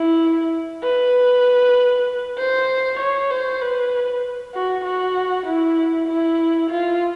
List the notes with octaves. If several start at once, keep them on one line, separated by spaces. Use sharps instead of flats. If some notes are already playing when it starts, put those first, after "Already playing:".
Already playing: E4
B4
C5
C#5
C5
B4
F#4
F#4
E4
E4
F4